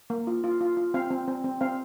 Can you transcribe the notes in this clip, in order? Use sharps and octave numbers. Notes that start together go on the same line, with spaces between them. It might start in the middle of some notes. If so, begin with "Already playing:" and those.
A#3
F4
F4
F4
F4
C4 F5
C4
C4
C4
C4 F5